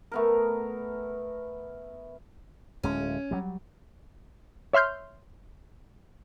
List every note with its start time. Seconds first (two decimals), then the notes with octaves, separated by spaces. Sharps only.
0.12 A3 B3 A#4
2.83 D1 G#3 C#4
3.31 F#3 G3
4.73 C#5 E5 C6 F6 G6